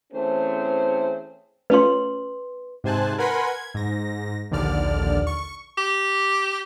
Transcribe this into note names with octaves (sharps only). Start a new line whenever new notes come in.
E3 A3 C4 C#4 G#4 C5
A3 C#4 F4 B4 C6
G#2 C3 C5 G#5 A5 F#6
A#4 B4 F#5 G#5 B5 C6
G#6
G#2 A#6
A#1 D#2 D3 D5 F6
C#6
G4